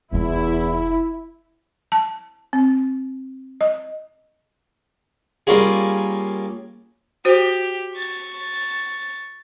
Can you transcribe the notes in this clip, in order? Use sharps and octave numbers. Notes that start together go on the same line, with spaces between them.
F1 E2 E4 F4
A5
C4
D#5
G3 A#3 C#4 F4 G#4
F#4 G4 C5
C#6 A6